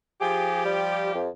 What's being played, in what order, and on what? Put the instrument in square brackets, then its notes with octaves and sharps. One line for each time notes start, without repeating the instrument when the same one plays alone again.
[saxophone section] F3 G4 [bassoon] G#4
[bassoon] G3
F2